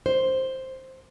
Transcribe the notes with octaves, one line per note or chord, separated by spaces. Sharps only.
C5